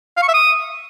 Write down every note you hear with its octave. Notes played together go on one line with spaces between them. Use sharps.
F5
C#6
E5
D#6